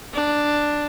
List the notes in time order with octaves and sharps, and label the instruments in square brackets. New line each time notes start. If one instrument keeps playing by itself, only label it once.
[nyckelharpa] D4